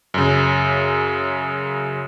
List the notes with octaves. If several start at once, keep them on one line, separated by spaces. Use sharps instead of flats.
F#2 C#3